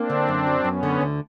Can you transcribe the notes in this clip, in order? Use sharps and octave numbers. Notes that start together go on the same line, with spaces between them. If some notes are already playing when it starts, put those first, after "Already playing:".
Already playing: A#3 C4 D4
D3
F#2
F#3
F#2 B3 C#4
D3
D2